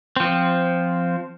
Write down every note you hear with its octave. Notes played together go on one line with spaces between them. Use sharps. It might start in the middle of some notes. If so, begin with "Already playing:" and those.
F3 C4